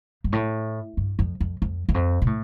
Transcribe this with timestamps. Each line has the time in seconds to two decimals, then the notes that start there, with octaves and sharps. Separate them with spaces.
0.24 G2
0.32 A2
0.97 G2
1.19 F2
1.40 F2
1.62 F2
1.89 E2
1.94 F2
2.22 B2
2.27 A2